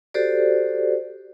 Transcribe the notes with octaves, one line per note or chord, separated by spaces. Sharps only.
F#4 G4 A4 C5 D5